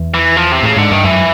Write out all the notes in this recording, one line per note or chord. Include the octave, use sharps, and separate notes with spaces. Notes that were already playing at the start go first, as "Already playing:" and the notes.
Already playing: E2
E3
F3
C3
A2 C#3
G#2 D3
G2 D#3
F#2 E3